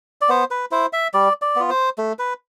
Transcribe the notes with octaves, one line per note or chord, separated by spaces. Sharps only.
D5
B3 C5
B4
E4 C5
E5
G3 D5
D5
B3 F4
C5
A3
B4